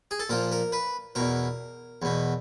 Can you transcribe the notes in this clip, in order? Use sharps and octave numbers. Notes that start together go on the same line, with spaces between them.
G#4
A4
A#2 F3 A#4
A#4
B4
E2 B2 A#4
E2 B2